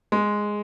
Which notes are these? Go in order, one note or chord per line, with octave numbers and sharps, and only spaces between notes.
G#3